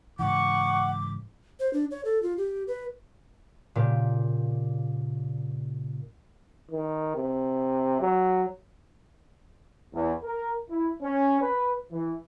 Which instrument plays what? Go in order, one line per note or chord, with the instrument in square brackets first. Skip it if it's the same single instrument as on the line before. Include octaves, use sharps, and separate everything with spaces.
[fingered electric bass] G#2 C#3 E3 [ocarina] F#5 [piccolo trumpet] C#6 [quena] D6
[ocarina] C5
D4
C#5
A4
F4
G4
B4
[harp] A#2 C#3 G4
[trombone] D#3
C3
F#3
[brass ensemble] E2
A#4
E4
C#4
B4
E3